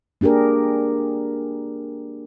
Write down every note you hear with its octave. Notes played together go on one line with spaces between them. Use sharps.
A#3 D4 G4 G#4 A#4